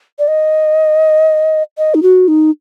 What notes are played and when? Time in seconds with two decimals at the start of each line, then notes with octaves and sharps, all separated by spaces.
0.19 D5
0.28 D#5
1.78 D#5
1.94 D#4
2.02 F#4
2.28 D#4